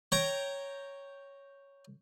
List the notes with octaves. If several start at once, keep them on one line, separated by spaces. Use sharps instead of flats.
C#5 G5 A#5